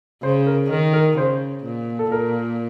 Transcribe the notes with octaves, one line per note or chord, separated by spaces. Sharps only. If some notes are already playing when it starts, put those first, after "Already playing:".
C#3 C5
A#4
D#3 A#4
A#4
C#3 C5
A#2
A4
A#2 A#4